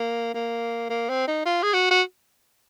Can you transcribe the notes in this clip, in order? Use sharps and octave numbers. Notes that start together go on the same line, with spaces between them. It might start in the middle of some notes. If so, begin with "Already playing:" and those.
Already playing: A#3
A#3
A#3
C4
D#4
F4
G#4
F#4
F#4